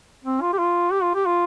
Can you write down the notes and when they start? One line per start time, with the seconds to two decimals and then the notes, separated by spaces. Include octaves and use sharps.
0.24 C4
0.41 F4
0.53 G4
0.58 F4
0.92 G4
1.03 F4
1.15 G4
1.26 F4